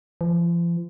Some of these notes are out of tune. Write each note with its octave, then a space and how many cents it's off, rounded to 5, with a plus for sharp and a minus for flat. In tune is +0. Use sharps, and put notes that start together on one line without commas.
F3 -40